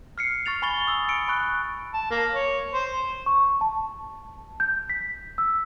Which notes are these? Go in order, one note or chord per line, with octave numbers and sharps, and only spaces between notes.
F6 C7 C#7
C#6 F6 A6 F7
G#5 B5 C#6 A6 G7
D#6 E6
E6 C#7 D7
B5 C#6 F#6
A5
A#3
C#5
C5
C#6
A5
G6
B6
E6